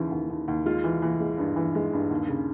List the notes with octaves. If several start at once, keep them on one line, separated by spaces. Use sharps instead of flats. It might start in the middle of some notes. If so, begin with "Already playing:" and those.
Already playing: D#2 C#3 E3
D#2
D#2
D#2
G#3 F4
E3
E3
G#3
G2
E3
G#3
G2
D#2
C#3